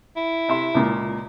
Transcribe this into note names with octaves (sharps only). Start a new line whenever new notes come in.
E4
C3 E5 C6
C#2 A#2